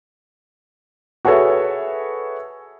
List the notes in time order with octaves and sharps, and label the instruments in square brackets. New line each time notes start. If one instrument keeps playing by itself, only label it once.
[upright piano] F#4 G#4 A4 B4 C#5 E5